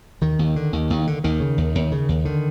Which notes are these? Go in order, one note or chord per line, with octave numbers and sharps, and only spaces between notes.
D#2 D#3
D#2
D3
D#2
D#2
D3
D#2 D#3
C#3
D#2
D#2
C#3
D#2
D3 D#3